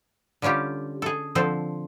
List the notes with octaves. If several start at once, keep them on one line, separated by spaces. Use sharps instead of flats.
D3 G3 C#4 F4 G4
G#4 A4
D3 F3 C4 A4 C5